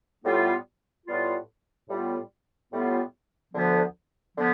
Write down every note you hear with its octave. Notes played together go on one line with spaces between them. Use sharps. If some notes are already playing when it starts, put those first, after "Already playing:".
A2 G3 B3 F4
A2 G3 B3 F4
A2 G3 B3 F4
A2 G3 B3 F4
D2 D3 F3 B3
D3 F3 B3